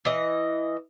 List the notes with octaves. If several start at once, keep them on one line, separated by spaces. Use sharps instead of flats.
E3 D#5